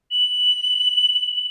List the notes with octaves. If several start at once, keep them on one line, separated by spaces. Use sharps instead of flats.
F#7